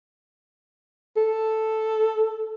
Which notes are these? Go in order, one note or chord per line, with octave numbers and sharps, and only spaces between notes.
A4